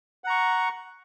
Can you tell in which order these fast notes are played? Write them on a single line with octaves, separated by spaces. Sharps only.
F#5 A#5 C#6